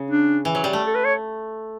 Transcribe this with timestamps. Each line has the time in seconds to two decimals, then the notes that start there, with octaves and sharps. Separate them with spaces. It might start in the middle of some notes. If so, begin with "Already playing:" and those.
Already playing: C#3
0.11 D4
0.45 E3
0.55 F#3
0.64 G3
0.73 A3
0.87 A4
0.95 B4
1.04 C#5